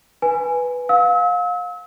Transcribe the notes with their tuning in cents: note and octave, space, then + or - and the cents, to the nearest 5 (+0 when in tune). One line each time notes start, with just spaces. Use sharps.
B4 +0 G#5 +0
F5 +30 E6 -35